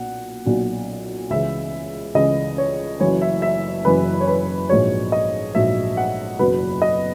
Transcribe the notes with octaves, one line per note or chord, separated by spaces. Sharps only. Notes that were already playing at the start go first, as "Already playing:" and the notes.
Already playing: B1 A#2 F#3 F#5
B1 A#2 F#3
C#2 C#3 E3 E5
C#2 C#3 E3 D#5
C#5
F#1 F#2 E3 C#5
E5
E5
F#1 F#2 E3 B4
C#5
B4
A#1 G#2 F#3 C#5
D#5
A#1 G#2 F#3 E5
F#5
F#1 E2 B2 F#3 B4
D#5